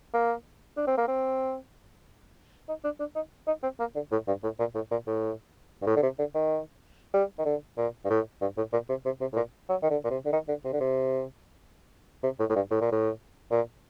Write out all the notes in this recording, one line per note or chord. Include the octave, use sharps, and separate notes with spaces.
A#3
D4
C4
A#3
C4
D#4
D4
D4
D#4
D#4
C4
A#3
D3
A2
G2
A2
A#2
A2
A#2
A2
G2
A2
D3
C3
D3
D#3
G3
D#3
D3
A#2
G2
A2
G2
A2
A#2
C3
C3
C3
A2
A#2
F#3
D#3
D3
A#2
C3
D3
D#3
D3
C3
D3
C3
C3
A2
A2
G2
A2
A#2
A2
A#2